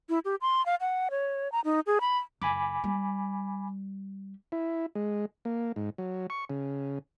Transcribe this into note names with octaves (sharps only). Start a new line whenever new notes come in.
E4
G4
C6
F5
F#5
C#5
A#5
D#4
G#4
B5
F#1 G#5 B5 D6
G3
E4
G#3
A#3
G#2
F#3
C#6
C#3